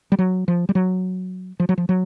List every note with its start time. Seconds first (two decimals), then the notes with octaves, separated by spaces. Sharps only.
0.12 G3
0.19 F#3
0.48 F3
0.69 G3
0.75 F#3
1.60 F3
1.69 F#3
1.78 F3
1.89 F#3